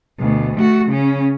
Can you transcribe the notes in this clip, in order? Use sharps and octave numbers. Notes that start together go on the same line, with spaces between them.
D2 B2
A3 F#4
C#3 C#4